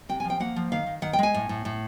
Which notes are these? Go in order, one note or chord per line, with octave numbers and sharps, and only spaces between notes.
C3 G5
G#5
F3
G5
A#3 F#5
F3
D#3 F5
D#3
D#3 F#5
G5
G#3 G#5
A2
A2
A2